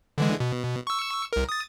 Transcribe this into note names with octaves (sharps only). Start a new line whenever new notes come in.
D3 E3 G#3
B2
C#6 E6
C2 A#4
D#6 A6